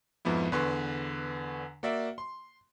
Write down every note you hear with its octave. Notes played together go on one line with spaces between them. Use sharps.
F2 G#2 F3 B3 E4
E2 D3 B4 C6 C#6
A#3 F#4 D5 E5
C6